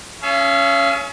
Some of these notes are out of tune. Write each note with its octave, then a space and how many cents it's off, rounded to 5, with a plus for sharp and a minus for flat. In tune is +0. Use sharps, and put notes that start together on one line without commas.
C#4 +10 G#4 +45 F5 -40